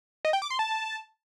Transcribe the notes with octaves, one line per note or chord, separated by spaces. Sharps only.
D#5
G5
D6
C6
A5